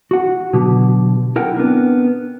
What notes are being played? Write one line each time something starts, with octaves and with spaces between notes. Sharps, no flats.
F#4 F#5
B2 D3 F#3 G4
E4 A#4 F#5 G5
B3 C4 D4 A#4